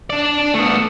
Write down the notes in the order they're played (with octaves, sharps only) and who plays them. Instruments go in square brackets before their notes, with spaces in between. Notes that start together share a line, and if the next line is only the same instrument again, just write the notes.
[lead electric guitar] D4 D5
A3 B3